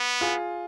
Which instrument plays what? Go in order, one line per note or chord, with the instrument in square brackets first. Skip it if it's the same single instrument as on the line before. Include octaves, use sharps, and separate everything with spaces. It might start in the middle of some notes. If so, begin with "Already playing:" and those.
Already playing: [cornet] B3
[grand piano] F4 G#4